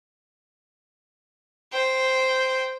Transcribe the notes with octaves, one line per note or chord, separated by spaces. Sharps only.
C5 G5